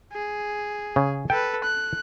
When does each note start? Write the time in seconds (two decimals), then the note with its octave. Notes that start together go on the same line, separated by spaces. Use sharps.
0.13 G#4
0.96 C#3
1.30 A4 B4 G5
1.64 F#6